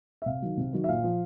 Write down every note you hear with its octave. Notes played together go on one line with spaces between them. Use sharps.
E5
C3 F5
D#3 F#3
C3
D#3 F#3
E5
A#2 F5
F3